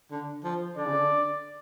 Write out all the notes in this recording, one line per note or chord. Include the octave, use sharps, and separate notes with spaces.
D3
F3
D3 D5
C#3
D3